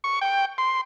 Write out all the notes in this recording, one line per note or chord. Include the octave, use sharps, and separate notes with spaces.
C#6
G5
C6